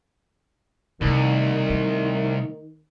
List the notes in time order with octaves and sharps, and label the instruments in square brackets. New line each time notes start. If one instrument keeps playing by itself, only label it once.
[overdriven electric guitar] C2 [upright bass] C3 A3 [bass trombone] D#3
[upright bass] A3